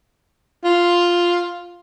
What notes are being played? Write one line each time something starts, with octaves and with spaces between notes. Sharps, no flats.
F4